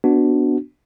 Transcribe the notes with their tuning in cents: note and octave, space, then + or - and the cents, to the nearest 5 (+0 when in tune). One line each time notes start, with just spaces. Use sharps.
B3 +0 D4 +0 F#4 +0